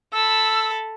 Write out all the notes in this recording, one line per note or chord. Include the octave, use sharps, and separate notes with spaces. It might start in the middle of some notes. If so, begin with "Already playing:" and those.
A4 B5 E6